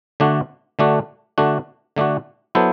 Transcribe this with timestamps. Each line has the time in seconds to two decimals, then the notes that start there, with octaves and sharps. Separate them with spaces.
0.20 D3 A3 D4 F#4
0.79 D3 A3 D4 F#4
1.38 D3 A3 D4 F#4
1.96 D3 A3 D4 F#4
2.55 F#3 B3 E4 A4 C5